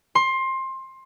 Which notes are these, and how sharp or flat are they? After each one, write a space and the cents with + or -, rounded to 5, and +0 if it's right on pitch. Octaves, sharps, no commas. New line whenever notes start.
C6 +20